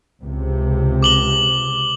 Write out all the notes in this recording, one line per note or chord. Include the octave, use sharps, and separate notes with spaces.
C#2 C3
D6 F#7 G7